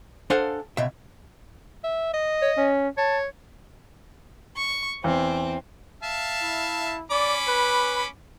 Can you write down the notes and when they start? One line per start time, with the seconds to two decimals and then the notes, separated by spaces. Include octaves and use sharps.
0.30 D4 A4 C5 F5 F#5 G#5
0.77 C#2 B2 E5
1.84 E5
2.13 D#5
2.42 C#5
2.57 C#4
2.98 C#5 A5
4.57 C#6
5.04 E2 C4
6.03 E5 F5 A5
6.42 E4
7.11 C#4 D5 B5 D6
7.48 B4